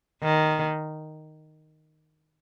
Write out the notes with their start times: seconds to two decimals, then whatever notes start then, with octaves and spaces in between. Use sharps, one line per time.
0.22 D#3